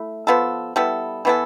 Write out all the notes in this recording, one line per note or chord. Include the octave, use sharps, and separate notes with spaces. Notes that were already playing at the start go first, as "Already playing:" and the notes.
Already playing: A3 E4
F3 B3 F4 A4
G3 B3 E4 A4
E3 B3 E4 A4